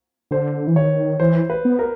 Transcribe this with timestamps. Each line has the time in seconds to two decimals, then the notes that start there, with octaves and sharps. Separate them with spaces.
0.31 D3 C5
0.67 E3
0.76 D#3 C#5
1.20 E3 C5
1.50 B4
1.65 B3
1.79 A#4